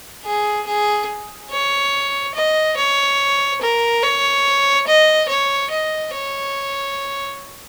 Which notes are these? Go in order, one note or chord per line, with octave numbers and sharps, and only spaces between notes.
G#4
G#4
C#5
D#5
C#5
A#4
C#5
D#5
C#5
D#5
C#5